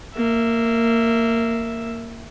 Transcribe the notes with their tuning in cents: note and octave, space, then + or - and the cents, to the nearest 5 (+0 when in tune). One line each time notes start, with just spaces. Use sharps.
A#3 -15 E5 +0